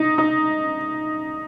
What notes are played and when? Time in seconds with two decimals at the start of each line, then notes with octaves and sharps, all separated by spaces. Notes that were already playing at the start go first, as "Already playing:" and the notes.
Already playing: D#4
0.18 D#4